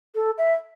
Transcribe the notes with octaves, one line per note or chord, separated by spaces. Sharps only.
A4
E5